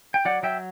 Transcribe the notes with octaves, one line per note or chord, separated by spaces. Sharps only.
G5
F#3 D5 F#5
F#3 E5 G5